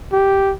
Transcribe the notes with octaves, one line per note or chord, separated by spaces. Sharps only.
G4